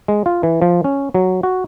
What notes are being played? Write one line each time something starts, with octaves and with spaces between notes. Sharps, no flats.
G#3
F4
E3
F3
C#4
F#3
F#4